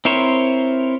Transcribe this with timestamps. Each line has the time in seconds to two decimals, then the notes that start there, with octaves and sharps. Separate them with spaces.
0.05 C4 E4 A#4 C5 C#5